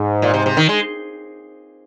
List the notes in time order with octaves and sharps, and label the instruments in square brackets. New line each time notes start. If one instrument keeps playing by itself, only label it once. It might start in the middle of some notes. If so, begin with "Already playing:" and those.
Already playing: [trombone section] G#2
[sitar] A#2
C3
C3
D#3
G#3